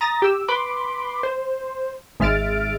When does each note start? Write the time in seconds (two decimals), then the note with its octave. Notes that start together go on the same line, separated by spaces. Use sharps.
0.01 A#5 D#6 A6 A#6
0.22 G4 E6
0.48 B4 B5 C6 D6
1.23 C5
2.20 G#1 G#3 E5 F6 A6 D7